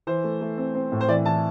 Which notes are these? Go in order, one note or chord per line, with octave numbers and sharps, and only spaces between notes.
E3 C5
A3
A3
C4
C4
A2
C5
E3 D5
E3 A5